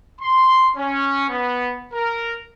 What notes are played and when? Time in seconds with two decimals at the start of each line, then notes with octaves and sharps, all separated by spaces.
0.20 C6
0.76 C#4
1.30 B3
1.93 A#4